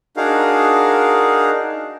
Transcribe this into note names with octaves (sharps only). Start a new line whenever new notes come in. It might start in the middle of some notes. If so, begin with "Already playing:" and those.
D4 D#4 F#4 G#4 A#4 F5